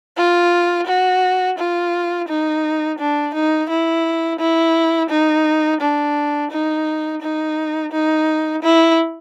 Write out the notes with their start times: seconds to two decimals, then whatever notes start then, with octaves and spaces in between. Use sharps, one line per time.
0.17 F4
0.87 F#4
1.58 F4
2.28 D#4
2.99 D4
3.34 D#4
3.69 E4
4.39 E4
5.10 D#4
5.81 D4
6.51 D#4
7.22 D#4
7.92 D#4
8.63 E4